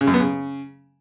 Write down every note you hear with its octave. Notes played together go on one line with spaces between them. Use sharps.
C#3
F#2
B3
C#3